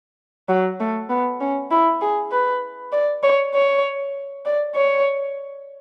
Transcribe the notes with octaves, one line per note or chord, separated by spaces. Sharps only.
F#3
A3
B3
C#4
E4
G#4
B4
D5
C#5
C#5
D5
C#5